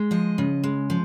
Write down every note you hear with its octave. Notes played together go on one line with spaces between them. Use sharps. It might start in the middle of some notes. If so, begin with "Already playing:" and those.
Already playing: G#3
F3 D#5
C#3
G#3
F3